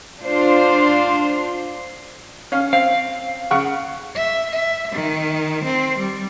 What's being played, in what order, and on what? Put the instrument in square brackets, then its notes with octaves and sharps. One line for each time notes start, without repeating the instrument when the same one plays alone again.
[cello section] D4 F4 C5
[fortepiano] C#4 F5
[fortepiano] C4 [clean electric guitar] F5
[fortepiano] C#3 F#5 C#6
[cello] E5
E5
D#3
C4
G3